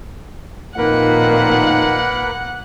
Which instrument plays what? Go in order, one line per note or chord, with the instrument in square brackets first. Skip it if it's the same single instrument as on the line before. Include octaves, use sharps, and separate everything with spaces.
[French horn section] F2 D#3 D#4 [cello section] A#2 [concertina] A#3 A#4 B4 [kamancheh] F#5